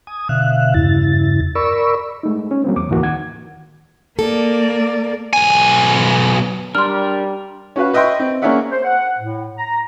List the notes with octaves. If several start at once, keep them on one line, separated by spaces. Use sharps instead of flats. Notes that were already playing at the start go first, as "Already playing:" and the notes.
G#5 D#6
B2 D3 E5 F5 F#6
E2 G2 C#3 E4 A6
A#4 D5 B5 C#6 E6
G#3 A3 D#4
C#4
F#3 G3 A#3 C4
E2 D6
D2 A2 E3 A#3 F#4
D#3 F#5 G#6
A#3 A4 D5
B1 G#5
G3 D4 A#4 C6 F6
C#4 F#4 B4 F5
B4 D#5 E5 G5 C6 C#6
C4
A#3 C#4 G#4 D5 E5 F#5
C5
F#5
A2
A#5